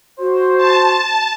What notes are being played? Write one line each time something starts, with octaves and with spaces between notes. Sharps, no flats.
F#4 C5
A5